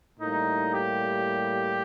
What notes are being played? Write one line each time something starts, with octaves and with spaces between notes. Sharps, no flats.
A2 G3 A#3 D#4
G4